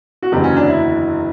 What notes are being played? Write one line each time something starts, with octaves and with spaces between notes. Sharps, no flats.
F#4
F#1 E2 D3 F#3 G4
C#4
D4
E4